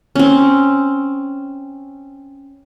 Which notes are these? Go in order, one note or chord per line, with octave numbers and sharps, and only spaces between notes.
C4 C#4